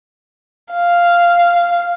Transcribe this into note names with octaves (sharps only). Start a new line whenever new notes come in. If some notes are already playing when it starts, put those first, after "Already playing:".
F5